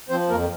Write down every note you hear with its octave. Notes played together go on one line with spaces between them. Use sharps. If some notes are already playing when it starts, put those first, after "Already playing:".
F3 C4 C5
F2 A#3 A#4